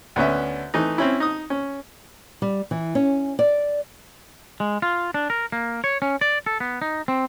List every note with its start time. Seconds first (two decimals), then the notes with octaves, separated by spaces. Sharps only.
0.16 D2 B3 C#4 E5
0.74 E3 A3 D#4
0.98 C4 C#4 E4
1.20 D#4 D#6
1.50 C#4
2.42 G3
2.71 E3
2.95 C#4
3.39 D5
4.60 G#3
4.82 F4
5.14 D4
5.30 A#4
5.52 A#3
5.84 C#5
6.02 C#4
6.21 D5
6.46 A4
6.60 B3
6.82 D#4
7.08 C4